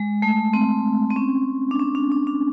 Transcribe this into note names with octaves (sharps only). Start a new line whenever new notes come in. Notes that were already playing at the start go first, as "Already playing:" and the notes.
Already playing: G#3
A3
C4
C4
C#4
D4
C#4
D4
D4
D4